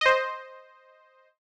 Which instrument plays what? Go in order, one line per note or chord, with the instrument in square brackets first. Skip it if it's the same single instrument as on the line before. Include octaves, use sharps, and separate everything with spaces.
[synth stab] C5 D#5